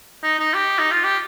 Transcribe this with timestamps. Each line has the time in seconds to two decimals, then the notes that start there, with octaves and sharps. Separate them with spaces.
0.23 D#4
0.39 D#4
0.54 G4
0.78 D#4
0.91 F4
1.04 G4